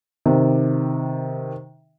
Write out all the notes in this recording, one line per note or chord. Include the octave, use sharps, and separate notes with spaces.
C3 D#3